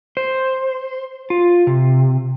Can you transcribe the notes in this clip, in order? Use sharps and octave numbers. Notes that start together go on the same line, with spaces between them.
C5
F4
C3